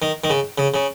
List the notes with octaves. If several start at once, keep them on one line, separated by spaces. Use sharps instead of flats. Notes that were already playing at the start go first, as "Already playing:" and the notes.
D#3
D#3
C#3
C#3
C#3